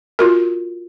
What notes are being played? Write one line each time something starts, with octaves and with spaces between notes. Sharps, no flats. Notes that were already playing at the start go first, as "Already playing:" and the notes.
F4 F#4 A#4